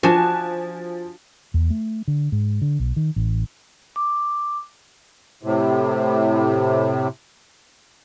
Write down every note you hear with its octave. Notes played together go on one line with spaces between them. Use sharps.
F3 D4 F#4 G#5 E7
E2
A3
D3
G#2
D3
B1
D#3
A1
D6
A2 C3